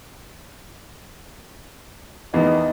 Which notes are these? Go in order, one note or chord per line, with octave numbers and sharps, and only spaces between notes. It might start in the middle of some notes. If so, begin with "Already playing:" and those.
E2 D#3 D#5